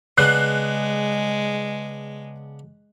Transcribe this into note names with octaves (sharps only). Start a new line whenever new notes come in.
C#3 G#3 B3 D4 F#6 C7